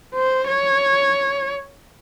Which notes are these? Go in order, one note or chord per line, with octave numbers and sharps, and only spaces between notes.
C5
C#5